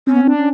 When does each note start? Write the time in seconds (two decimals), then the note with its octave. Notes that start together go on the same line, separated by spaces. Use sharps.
0.07 C4 C#4
0.14 B3
0.21 C4
0.27 D4
0.37 C#4